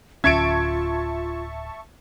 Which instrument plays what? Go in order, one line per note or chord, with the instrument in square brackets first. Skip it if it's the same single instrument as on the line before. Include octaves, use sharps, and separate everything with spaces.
[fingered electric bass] D1 C#4 [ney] F4 [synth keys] E5 A5 C#6 [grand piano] G#6 D7